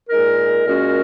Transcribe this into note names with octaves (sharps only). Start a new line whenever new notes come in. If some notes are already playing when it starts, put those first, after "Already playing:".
A#2 G#3 D#4 A#4
A#2 G#3 C#4 F#4 A#4